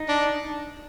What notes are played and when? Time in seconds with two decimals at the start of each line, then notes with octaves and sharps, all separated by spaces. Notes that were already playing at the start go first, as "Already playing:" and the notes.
Already playing: D#4
0.08 D4